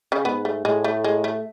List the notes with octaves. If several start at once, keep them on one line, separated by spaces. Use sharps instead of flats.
C#3 C#4
G#2 B3
A3
A2 G#3
A3
G#3
A3